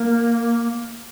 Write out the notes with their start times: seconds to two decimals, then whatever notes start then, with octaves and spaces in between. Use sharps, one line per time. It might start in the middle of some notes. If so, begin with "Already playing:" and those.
Already playing: A#3